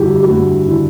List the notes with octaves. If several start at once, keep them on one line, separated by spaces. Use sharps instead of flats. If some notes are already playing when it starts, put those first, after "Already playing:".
Already playing: G2 D3 E4 F#4 G4
G4
G2 F#4
D3 E4